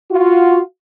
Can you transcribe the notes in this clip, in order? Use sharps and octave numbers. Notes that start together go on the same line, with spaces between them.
F4 F#4